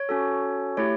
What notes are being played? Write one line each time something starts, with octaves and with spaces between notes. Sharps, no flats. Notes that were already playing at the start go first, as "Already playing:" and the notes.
Already playing: C#5
C#4 F#4 A4
A3 E4 G4 C#5